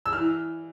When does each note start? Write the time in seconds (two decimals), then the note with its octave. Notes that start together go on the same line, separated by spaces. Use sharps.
0.06 E6
0.13 E3 F6